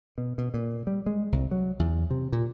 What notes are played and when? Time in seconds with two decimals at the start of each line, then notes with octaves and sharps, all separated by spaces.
0.18 B2
0.38 B2
0.54 A#2
0.87 G3
1.06 G#3
1.32 C2
1.51 F#3
1.79 E2
2.11 C3
2.32 A#2